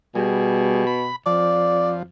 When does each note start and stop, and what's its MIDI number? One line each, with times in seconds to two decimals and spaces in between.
0.15 1.11 47
0.15 0.85 55
0.15 0.85 68
0.87 1.16 83
1.26 2.09 41
1.26 2.03 53
1.26 1.95 74